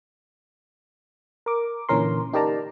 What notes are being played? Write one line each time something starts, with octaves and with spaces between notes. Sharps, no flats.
A#4 D6
A#2 D3 E3 C#4 A#4 C6
D#4 G4 A#4 D5 A5 A#5